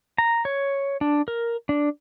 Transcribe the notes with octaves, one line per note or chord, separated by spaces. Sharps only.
A#5
C#5
D4
A#4
D4